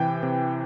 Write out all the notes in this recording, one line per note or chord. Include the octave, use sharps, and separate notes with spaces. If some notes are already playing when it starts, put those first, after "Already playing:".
Already playing: C3 E3 G5
C3